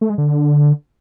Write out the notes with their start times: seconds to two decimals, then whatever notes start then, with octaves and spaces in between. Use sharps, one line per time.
0.01 A3
0.10 G#3
0.18 D3